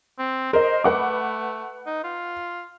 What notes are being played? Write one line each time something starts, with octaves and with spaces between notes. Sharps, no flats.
C4
A#4 C5 D#5
A3 B4 F#5 D6
D#4
F4